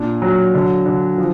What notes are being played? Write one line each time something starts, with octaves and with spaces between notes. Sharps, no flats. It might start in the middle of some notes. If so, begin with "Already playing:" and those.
Already playing: A#2 D4
F#3
D3
D3
F3